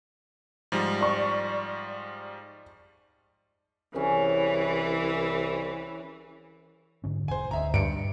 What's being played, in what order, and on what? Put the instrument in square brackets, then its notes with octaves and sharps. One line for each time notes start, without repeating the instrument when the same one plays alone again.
[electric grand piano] G#2 F3 G3
[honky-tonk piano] D5 C#6
[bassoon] C2 [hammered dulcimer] C#3 C#4 [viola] E3
[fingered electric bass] G#2 D3 C#4
[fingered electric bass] E1 [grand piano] C5 G#5
[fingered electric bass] D2 [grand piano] D#5 E5 A#5
[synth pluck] G2 [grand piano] C#7 D7